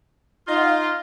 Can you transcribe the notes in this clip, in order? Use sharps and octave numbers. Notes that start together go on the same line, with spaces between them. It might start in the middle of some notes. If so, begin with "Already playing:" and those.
D#4 F4 D#5
F#5
F5